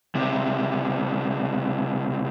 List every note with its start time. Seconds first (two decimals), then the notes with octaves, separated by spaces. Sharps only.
0.15 C#2 C3